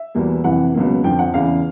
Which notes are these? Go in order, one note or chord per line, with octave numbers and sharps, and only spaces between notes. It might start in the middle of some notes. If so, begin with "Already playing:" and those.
Already playing: E5
E2 B2 G3 A#3
F2 C3 E3 F#5
C#2 B2 F#3 A#3
F2 D3 F3 G5
F#5
E2 C#3 E3 F5